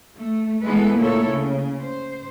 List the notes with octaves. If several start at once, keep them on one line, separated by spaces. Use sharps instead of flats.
A3
E3 G#3 B3 A4 B4
D2 A#2 A#3 E4 A4 C#5
C#3
C5